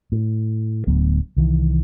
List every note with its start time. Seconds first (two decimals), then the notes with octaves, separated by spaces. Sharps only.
0.12 A2
0.87 D1 D2 F#3 B3
1.37 C2 D#3 E3